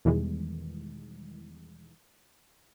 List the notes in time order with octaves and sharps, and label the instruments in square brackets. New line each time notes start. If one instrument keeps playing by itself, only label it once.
[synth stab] E2 B2 D#3 E3 G3 G#3